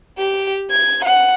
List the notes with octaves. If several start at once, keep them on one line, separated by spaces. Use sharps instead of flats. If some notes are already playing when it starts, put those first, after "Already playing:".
G4
G#6
F#5